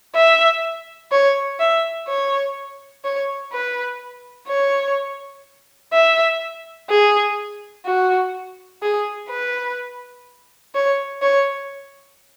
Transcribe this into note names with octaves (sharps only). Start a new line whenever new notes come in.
E5
C#5
E5
C#5
C#5
B4
C#5
E5
G#4
F#4
G#4
B4
C#5
C#5